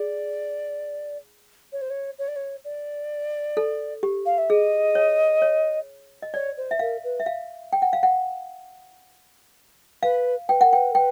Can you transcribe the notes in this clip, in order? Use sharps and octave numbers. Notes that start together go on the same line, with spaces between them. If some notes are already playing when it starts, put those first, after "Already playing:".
Already playing: G#4 D5
C#5
C5
C#5
C#5
D5
C#5
D5
A4
G4
F5
E5
G#4 D#5
C#5
C#5
D#5
C#5 D5
C5
E5
A#4 F5
B4
E5
F5
G5
F#5
F5
F#5
B4 F5
B4 G5
A#4 F#5
B4 G5
A#4
B4 G5